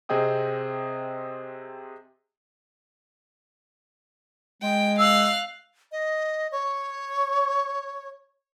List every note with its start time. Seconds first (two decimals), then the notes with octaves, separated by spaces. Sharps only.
0.09 C3 C4 G#4 D#5 G5 D#6
4.62 G#3 G5
4.99 F5 E6 F#6
5.92 D#5
6.52 C#5